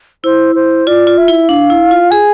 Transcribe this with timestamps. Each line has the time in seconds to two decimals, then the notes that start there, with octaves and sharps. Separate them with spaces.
0.24 E4 C5
0.55 C5
0.87 F4 D5
1.07 F4
1.18 E5
1.28 E4
1.49 D4 F5
1.70 E4
1.91 F4
2.11 G#4 G#5